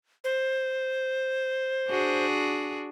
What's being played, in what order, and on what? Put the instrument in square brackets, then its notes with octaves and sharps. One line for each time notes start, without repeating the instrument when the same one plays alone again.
[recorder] C5
[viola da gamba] D4 F#4 G#4